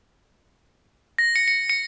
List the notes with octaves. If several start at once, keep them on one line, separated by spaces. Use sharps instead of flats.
A#6
C#7
C#7
C#7